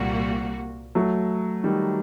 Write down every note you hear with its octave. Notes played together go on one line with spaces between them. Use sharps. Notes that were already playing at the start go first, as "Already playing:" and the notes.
Already playing: C2 A#2 G3 A#3 F#4
F#3 A3
D#3 G3